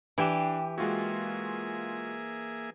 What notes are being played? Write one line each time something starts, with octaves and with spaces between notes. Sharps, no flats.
E3 D4 G4 E7
G#3 A#3 F4 F#4 G#4 E5